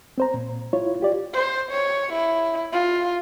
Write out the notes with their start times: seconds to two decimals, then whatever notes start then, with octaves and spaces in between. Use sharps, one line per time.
0.18 C4 C5 A#5
0.34 A#2
0.73 E4 F4 C#5
1.01 F4 G4 D5
1.34 C5
1.71 C#5
2.13 E4
2.73 F4